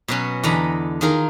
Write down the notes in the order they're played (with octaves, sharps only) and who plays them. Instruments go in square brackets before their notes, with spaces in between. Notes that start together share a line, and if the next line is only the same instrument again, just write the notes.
[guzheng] B2 F#3 C#4
E2 D3 A4 D#5 A#5 B5
D#3 F4 G#4 A#4